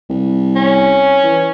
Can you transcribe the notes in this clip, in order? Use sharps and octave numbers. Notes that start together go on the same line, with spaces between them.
C2
C#4
E3